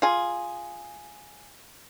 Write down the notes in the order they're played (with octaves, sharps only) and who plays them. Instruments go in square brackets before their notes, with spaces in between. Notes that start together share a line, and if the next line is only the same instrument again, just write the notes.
[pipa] F4 G#4